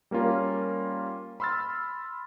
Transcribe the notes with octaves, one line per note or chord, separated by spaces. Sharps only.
G3 A#3 C#4 F4 A#4
B5 C6 E6 F6 A6